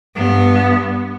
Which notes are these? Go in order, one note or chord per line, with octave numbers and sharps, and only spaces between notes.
G2 B3